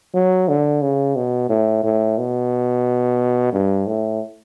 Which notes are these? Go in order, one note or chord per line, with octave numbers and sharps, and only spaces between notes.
F#3
D3
C#3
B2
A2
A2
B2
G2
A2